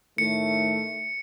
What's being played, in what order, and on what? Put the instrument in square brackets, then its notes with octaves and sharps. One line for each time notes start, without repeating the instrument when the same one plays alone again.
[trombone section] A2 D#3 A3 [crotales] C#7